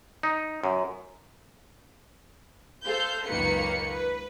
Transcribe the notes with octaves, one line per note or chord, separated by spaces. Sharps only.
D#4
F#2
A4 C5 F5 G6
C#2 F#2 D#3 A#3 B4 C#7
B4